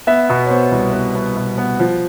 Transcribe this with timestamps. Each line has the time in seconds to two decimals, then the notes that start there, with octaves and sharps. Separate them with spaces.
0.07 B3 E5
0.29 B2
0.45 C#5
0.50 B3 C5
0.72 C2
0.93 B3 B4
1.15 B3
1.36 B2
1.58 B3
1.80 F3